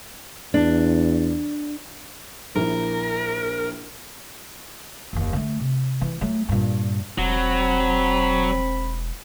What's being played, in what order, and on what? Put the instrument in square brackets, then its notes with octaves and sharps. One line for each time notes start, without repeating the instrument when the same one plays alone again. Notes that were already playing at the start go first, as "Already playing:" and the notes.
[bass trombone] E2 [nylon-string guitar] D4
[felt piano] A#1 E4 [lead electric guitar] A#4
[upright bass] F#1 D#2
D3 A3
C3
E3
F#3 A3
G2 A#2
[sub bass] E1 [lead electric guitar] F#3 [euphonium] C4 [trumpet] B5